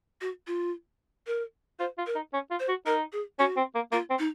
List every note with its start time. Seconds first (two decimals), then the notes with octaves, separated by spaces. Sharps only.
0.21 F#4
0.47 F4
1.27 A#4
1.79 F4 C5
1.98 F4
2.07 A#4
2.15 D#4
2.33 C#4
2.51 F4
2.60 C5
2.68 F#4
2.86 D#4 A#4
3.12 G#4
3.39 C#4 F#4
3.57 C4
3.75 A#3
3.92 A#3 F4
4.10 C4
4.19 D#4